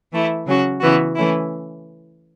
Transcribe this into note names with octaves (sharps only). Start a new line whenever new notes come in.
E3 A3 E4
C#3 F#3 C#4 F#4
C#3 E3 B3 F#4
E3 A3 C#4 E4